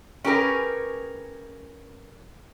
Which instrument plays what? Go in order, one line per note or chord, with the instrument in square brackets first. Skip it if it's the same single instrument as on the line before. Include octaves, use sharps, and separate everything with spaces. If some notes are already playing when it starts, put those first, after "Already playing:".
[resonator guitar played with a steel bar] C#4 G4 G#4 A#4 B4